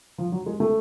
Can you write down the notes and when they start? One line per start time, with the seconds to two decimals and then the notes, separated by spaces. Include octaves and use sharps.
0.18 F3
0.32 F#3
0.46 G#3
0.60 A3